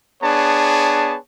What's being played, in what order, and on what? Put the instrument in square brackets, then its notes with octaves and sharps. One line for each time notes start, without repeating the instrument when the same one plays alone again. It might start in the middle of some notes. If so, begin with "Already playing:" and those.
[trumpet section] B3 D4 G#4 C#5 A5